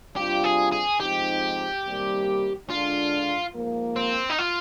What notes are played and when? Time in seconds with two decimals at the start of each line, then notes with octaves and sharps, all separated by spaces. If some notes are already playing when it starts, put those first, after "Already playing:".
0.16 C3 G3 D4 F4 G4
0.44 G#4
0.72 G#4
1.00 G#2 F3 C4 D#4 G4
1.84 C3 D#3 G3 A#3
2.69 D3 G#3 D4 F4
3.54 G#2 F3 A#3
3.96 C4
4.30 D#4
4.39 F4